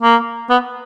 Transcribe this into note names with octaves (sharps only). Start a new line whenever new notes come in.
A#3
B3